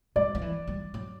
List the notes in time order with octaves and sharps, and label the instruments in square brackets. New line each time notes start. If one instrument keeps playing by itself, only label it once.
[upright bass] G#3 [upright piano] D5
[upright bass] F3
E3
G3
F#3